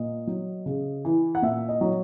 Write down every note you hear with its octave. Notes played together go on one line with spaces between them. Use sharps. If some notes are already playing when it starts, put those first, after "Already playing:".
Already playing: A#2 D#5
F#3
C#3
E3
F#5
A#2 E5
D#5
F#3